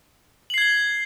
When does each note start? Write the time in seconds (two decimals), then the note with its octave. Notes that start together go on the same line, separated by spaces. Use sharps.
0.50 F#7
0.54 C7
0.58 G#6
0.62 G7